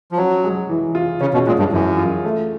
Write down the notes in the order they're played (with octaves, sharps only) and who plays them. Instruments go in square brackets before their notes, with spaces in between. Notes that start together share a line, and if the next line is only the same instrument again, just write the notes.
[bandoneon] F3
[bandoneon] F#3 [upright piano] C#4
[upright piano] G#3
E3
F4
[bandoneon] C#3 [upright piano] C#4
[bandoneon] B2
[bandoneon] A#2 [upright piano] G#3
[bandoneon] G2
[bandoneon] F#2 [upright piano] E3
[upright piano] F4
A3